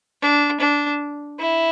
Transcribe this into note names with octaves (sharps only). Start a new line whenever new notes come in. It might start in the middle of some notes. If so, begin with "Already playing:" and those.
D4
D4
E4